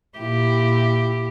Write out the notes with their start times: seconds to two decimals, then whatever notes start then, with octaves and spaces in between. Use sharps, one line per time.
0.18 A#2 E4 G4